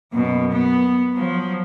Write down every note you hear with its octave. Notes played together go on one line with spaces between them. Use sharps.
F#2 B2
B3
F3 F#3